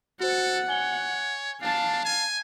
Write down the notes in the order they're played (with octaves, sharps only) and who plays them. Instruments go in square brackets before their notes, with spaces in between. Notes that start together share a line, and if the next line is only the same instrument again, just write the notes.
[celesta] F#4 C5 [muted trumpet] A4 [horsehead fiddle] F#5
[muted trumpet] C#5 [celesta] G#5 G7
[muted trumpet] D4 [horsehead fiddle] F5 A5
[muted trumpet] G#5